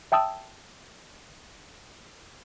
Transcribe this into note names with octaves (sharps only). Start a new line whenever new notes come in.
E5 G5 A5 D#6 E6